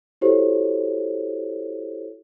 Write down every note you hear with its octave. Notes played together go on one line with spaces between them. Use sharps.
E4 F#4 G4 A4 C5 C#5